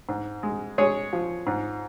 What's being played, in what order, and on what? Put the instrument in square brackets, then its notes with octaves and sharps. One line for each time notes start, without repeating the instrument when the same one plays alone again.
[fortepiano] G#2
G#3
G#3 G#4 C#5
F3
G#2